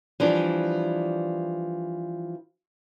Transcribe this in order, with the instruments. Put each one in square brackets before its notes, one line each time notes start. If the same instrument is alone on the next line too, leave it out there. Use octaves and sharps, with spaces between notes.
[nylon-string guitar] E3 F3 G3 D4